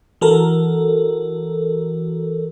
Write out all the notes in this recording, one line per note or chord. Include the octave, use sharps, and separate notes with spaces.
E3 F#4 A4 A#4